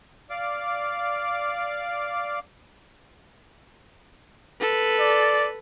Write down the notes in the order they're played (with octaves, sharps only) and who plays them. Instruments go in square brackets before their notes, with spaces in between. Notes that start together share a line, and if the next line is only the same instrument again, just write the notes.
[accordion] D5 F5 D6
[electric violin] A4 B4
[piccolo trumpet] D5